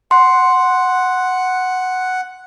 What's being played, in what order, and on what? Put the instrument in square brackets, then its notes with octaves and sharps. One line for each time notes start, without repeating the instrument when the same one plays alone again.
[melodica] F#5 [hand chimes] C6